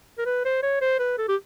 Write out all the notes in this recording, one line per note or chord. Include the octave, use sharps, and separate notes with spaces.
A#4
B4
C5
C#5
C5
B4
A4
G4